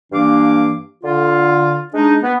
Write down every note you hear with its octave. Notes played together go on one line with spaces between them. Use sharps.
G2 E3 A#3 D4 F5 D6
D3 F4
G#3 D4 D#4
B3